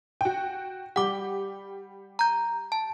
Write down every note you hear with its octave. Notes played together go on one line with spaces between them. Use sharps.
F#4 G5
G3 G4 F#5 D6
A#5 G6
A5